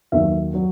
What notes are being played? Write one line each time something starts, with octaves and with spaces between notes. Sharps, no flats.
D#2 D#3 F#3 E5
F#3